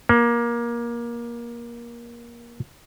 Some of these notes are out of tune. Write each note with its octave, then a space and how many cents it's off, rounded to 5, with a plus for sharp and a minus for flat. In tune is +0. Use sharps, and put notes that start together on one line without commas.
A#3 +20